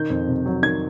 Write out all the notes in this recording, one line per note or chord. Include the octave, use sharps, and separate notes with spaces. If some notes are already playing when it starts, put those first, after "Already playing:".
Already playing: D#3 G6
F2
C3
F#3
D#3 G#6